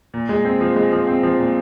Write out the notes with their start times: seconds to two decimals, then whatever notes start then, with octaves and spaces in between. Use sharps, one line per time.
0.14 A#2
0.29 G#3
0.45 C4
0.61 F3
0.76 G#3
0.92 F3
1.07 C4
1.23 F3
1.39 A#2